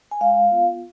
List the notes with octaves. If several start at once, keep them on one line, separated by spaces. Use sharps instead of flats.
G#5
G#3 F5
B3 F4